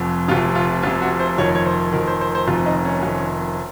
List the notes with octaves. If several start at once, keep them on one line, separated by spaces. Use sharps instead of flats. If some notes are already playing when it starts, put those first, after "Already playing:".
Already playing: F1 F2
F1 F2 C3 F4
F4
F1 F2 C3 F4
F#4
C5
F1 F2 D#3 C#5
C#5
C5
F1 F2 D#3 A#4
C5
C5
C5
F1 F2 D#3 F4
D#4
C#4
F1 F2 D#3